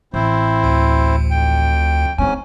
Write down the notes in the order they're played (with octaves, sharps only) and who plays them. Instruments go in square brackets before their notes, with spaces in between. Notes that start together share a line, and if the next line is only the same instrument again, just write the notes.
[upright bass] A1 [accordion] C4 E4 C5
[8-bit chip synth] D2
[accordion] F2 G5
[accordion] G#2 C#4 [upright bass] G#3 C4 [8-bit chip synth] G#5